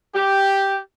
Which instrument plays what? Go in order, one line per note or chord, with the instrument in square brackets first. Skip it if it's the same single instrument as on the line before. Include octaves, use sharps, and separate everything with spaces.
[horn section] G4